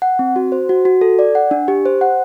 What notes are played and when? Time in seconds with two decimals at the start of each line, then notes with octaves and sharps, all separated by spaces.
0.02 F#5
0.19 C4
0.36 F#4
0.52 C5
0.69 F#4
0.85 F#4
1.01 A4
1.19 D5
1.35 F#5
1.51 D4
1.68 G4
1.86 C5
2.01 F#5